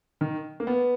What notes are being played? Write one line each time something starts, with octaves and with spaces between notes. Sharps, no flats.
D#3
A#3
B3